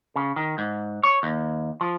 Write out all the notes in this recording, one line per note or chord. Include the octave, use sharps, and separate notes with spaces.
C#3
D#3
G#2
C#5
D#2
F3